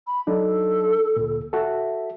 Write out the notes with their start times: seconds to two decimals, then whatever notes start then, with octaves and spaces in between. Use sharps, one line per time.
0.07 B5
0.27 F#3 D4 D#4 A4
1.16 D2 A#2
1.53 F#4 A4 E5